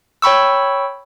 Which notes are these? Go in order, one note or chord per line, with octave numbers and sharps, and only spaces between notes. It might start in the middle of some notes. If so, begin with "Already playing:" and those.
C#5 G5 B5 C#6 E6